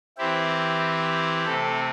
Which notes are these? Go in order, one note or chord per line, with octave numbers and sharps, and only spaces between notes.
E3 C4 E4 G4
C3 A3 C4 A4